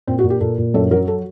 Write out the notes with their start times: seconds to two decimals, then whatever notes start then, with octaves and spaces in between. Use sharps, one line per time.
0.07 A#2 C4
0.19 F#4
0.24 A#2
0.30 G4
0.40 A#2 A4
0.58 A#2
0.74 F#2 A4
0.91 F#3 A#4
1.08 A4